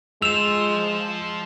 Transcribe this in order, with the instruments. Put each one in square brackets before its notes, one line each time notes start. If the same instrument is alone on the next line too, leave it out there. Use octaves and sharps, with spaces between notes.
[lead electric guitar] F3 C5 [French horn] G#3 [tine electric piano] E6 [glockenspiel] E7 F7